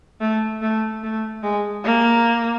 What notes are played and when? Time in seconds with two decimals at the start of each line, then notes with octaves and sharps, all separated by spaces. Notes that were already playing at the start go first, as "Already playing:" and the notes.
0.21 A3
0.62 A3
1.03 A3
1.43 G#3
1.85 A#3